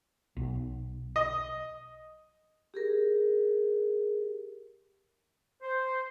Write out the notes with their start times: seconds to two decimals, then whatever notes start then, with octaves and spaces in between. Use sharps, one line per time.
0.37 B1
1.16 D#5
2.74 G4 G#4 A#4
5.62 C5